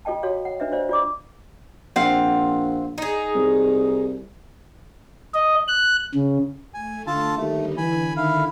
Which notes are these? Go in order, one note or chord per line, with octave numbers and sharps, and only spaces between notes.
F4 A4 D#5 G5 A5
F#4 A4 C#5 F5
F#5
D4 B4 D#5 E5
F4 C5 D5 F5
F4 D5 D6
A#1 C4 F5 F#5
D#4 G#4
C2
D#5
F#6
C#3
A3 G#5
D3 F4 A4 A5
D#2 D3 G3 A3 D#4
D3 E3 G#5 B5
D#3 E4 F5